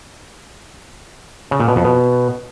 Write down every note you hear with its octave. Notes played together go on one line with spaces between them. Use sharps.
C#3
A#2
B2
F2
B2